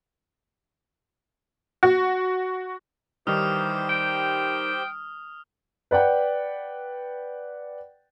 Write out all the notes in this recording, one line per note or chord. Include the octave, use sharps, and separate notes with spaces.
F#4
D#3 E3 G3 D#4 G4 C5 D#6 F6
G5
B4 D5 F#5 G5